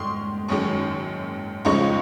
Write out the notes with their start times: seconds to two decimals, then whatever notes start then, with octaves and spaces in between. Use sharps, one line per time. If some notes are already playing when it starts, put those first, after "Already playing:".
Already playing: G#2 D#3 C6 C#6 D#6 F6
0.48 F#1 F#2 D#3 G#3 C#6
1.65 C#2 C#3 F3 G#3 D#4 C#6